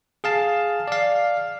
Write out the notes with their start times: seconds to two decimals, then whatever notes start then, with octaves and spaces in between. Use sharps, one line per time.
0.24 G#4 F5 A5
0.88 D5 F5